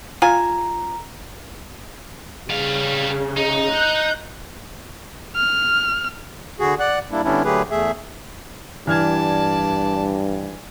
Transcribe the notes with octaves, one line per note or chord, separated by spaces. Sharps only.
F4 G#5 A#5
C#3 G3 F5
D#4
F#6 G6
F6
D3 F#4 G#4
D5 F#5 F#6
G3 A#3 D4 E4
D3 G3 B3 C#4 D4 E4
D3 F#3 A3 G4 G#4 B4
E2 A3 G#4 E5
G2 E3 D5 A5 F6 G#6